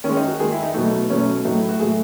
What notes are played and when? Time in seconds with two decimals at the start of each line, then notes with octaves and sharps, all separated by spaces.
0.04 D#3 C#4
0.09 G#3
0.17 D#4
0.27 F#4
0.40 D#3 G#3 G#4
0.52 E4
0.63 D#4
0.74 B2 F#3 A3 D#4
1.10 B2 F#3 A3 C#4
1.45 A2 F#3 A3 D#4
1.57 E4
1.69 F#4
1.79 A2 F#3 A3 G#4